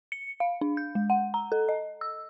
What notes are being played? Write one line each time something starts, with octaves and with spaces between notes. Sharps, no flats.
C#7
F5
D4
G6
G#3
F#5
A#5
A4
D#5
E6